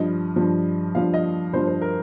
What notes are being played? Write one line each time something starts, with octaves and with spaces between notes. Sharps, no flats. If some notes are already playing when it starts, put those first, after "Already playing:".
Already playing: G2 F3 D#5
G2 F3
G2 F3 F5
D#5
G2 F3 C5
C5
A#4